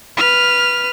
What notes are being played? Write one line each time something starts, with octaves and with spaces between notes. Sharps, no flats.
B4 F6